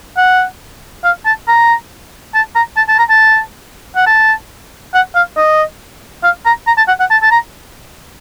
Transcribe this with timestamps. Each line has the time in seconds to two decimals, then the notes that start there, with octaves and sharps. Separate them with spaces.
0.17 F#5
1.04 F5
1.25 A5
1.48 A#5
2.34 A5
2.55 A#5
2.77 A5
2.88 A5
2.99 A#5
3.10 A5
3.96 F#5
4.06 A5
4.94 F#5
5.15 F5
5.37 D#5
6.23 F5
6.45 A#5
6.67 A#5
6.77 A5
6.88 F#5
7.00 F#5
7.10 A5
7.22 A5
7.31 A#5